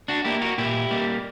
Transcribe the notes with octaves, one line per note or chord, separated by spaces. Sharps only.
D4 F#4
A#3 E4 G4
F#4 A#4
A#2 E4 G4
G3 A#3